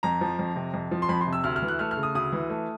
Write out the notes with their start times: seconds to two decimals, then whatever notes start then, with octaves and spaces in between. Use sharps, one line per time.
0.03 F2 A#5
0.21 F3
0.39 F2
0.56 C3
0.74 F2
0.91 F3
1.02 C6
1.09 F2 B5
1.21 C6
1.27 C3
1.33 E6
1.44 D2 F6
1.56 F6
1.62 E3
1.68 F#6
1.79 A3 F6
1.91 F6
1.97 C#3
2.03 D#6
2.15 D2 D#6
2.32 E3
2.50 A3